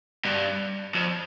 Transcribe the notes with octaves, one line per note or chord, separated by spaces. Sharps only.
G2
F2